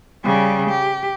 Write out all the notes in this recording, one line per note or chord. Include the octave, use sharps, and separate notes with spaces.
C#3 G3
G4